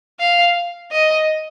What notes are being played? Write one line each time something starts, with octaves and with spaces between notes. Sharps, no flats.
F5
D#5